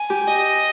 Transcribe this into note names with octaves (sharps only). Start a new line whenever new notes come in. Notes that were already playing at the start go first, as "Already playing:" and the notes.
Already playing: G#5
G4
D#5